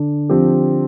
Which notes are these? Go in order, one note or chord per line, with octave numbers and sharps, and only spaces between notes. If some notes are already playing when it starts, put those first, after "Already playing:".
Already playing: D3 D4
F3 C4 G4